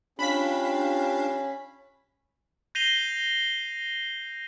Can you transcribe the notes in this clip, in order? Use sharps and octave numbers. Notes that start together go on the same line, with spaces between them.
C#4 D4 F4 G4 F5 B5 B6
G6 A#6 C7 D#7 F7 G7